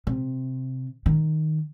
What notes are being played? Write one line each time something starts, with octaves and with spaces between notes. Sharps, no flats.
C3
D#3